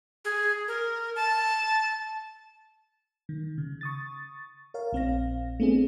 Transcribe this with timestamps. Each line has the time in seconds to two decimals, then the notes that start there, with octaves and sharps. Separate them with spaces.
0.25 G#4
0.68 A#4
1.16 A5
3.29 D#3
3.58 C#3
3.81 C#6 D#6 A6
4.74 A#4 C#5 F5
4.93 A#1 C4 F5 A#6
5.60 A3 B3 C4 D4 G#4